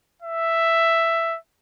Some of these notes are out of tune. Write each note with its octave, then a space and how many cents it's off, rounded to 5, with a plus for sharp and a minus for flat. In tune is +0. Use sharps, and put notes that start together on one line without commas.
E5 +5